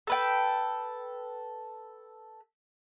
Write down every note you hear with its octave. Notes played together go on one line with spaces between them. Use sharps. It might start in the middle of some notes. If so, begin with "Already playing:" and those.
A4 B4 G5